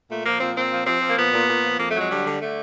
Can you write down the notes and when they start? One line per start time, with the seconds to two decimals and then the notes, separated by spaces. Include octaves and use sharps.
0.09 A#2 A3
0.25 F3 A#3
0.40 A#2 C4
0.55 A#2 C4
0.71 F3
0.86 F3 C4
1.02 F3
1.09 A#3
1.17 A#2 B3
1.32 A#2
1.48 A#2
1.63 F3
1.79 F2 A#3
1.90 F#3 A3
1.99 G#3
2.09 D3 G3
2.25 D3
2.40 D3 A3